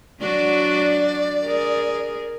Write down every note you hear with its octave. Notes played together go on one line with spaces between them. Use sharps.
F#3 D4 F#4 D5
G#4 A#4